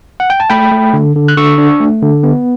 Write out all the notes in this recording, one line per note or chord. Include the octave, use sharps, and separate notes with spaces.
F#5
G5
A5
A3 G5 B5
A3
D3
D3
F#6
D3 C#6 E6
D4
A3
D3
B3